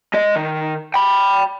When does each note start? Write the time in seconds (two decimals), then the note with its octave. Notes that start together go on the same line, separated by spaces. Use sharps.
0.14 G#3 D#5
0.36 D#3
0.94 G5 B5